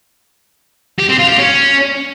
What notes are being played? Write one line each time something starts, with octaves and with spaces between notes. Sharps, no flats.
G4
C4
F4
G4
C#4